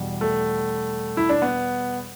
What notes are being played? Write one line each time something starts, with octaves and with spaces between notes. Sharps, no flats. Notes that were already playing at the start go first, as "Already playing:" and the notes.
Already playing: E2 B2 G3
A3
E4
D4
B3